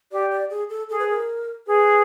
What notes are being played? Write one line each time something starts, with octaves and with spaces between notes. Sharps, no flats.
G4 D5
D5
G#4
A4
G#4 A4
B4
A#4
G#4 B4